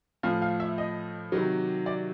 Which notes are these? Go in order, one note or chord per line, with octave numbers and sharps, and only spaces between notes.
A2 F3 F5
F5
E5
D#5
C3 D#3 F#3
D5